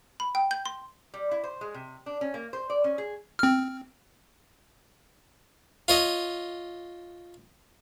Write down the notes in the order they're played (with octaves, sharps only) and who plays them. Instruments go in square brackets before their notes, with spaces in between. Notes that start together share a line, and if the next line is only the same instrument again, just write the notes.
[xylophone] B5
G5
G6
C6
[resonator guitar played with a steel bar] G3
E4
C5
G#3
C3
D4
C#4
A#3
C5
D5
C#4
G#4
[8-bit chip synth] C4 F6
[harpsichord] F4 C#5 D#5